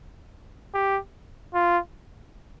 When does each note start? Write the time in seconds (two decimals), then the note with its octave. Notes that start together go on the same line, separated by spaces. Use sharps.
0.75 G4
1.54 F4